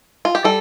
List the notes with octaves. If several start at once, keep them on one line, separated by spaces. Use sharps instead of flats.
F4
G4
G3 A4